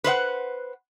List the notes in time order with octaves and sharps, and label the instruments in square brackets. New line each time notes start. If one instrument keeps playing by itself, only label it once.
[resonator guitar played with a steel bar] B4 C5 D#5 F#5